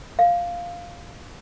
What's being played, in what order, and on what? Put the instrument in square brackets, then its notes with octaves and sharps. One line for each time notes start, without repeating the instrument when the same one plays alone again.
[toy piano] F5